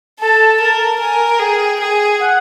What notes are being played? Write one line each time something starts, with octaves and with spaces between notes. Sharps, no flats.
A4 A5
A#4
A#4 G#5
G#4 G5
G#4
F#5